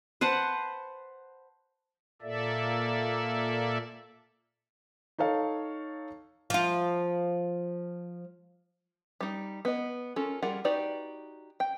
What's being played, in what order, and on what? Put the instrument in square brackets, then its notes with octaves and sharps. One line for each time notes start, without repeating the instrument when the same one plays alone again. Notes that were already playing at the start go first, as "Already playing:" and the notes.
[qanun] B4 C5 F#5 A5
[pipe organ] A#2 A#3 A4 D5 E5
[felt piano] D#4 A4 C#5 F5
[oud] F3 F4
[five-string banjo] G3 D#4
B3 D#5
C#4 F4 A4 A#4
G3 F4 G#4 A#4 F#5
D#4 F#4 G4 B4 D5
G5